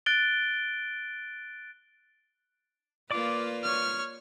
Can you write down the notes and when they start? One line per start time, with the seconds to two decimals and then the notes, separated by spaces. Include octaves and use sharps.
0.06 F#6 A6 D7 G7
3.11 A#3 F4 B4 D5 D6
3.63 C#5 F6